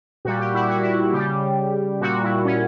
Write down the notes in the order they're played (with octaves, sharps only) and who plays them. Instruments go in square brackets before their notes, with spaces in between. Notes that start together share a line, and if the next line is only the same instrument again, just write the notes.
[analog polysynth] A#2 G3 F#4
G4
E4
F#4
E4
C#3 G3 G4
A#2 G3 F#4
E4
C#4